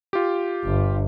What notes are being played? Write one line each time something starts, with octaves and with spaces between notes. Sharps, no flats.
F4 G4
G1